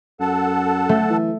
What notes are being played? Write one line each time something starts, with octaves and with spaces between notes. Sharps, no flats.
F#2 A4 F#5 A5
A3
E3